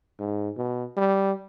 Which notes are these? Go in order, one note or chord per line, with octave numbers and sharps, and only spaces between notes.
G#2
B2
G3